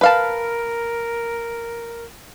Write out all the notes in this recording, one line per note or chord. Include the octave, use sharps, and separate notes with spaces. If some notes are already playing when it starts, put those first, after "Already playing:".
A#4 B4 F5 A5